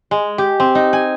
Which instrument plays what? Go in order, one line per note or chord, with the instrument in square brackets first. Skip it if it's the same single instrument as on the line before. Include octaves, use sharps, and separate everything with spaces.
[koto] G#3
G4
C4
D#4
G#5